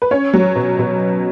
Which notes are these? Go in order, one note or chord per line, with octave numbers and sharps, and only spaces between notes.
B4
C#4 C#5
F#3
B2
B2